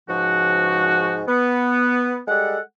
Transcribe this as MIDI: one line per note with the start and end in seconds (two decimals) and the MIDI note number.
0.09 1.22 37
0.09 1.22 44
0.09 1.22 53
0.09 1.22 66
1.27 2.19 59
2.28 2.58 55
2.28 2.58 56
2.28 2.58 69
2.28 2.58 78